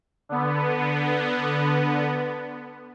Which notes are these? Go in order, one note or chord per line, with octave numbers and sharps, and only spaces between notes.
D3 B3